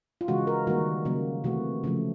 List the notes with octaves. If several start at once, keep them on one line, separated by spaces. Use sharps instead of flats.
F4
C#3 E3 G#3 F#4
A#4
D#3 G3 A#3 F#4
C#3 F#3 A#3
C3 E3 A3 F#4
C#3 F3 A3